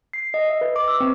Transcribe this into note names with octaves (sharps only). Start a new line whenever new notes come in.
C7
D#5
E5
B4
D6
E6
C4